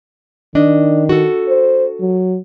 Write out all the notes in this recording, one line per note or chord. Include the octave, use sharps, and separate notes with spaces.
D#3 D4 D#5
F#4 A4
C5
F#3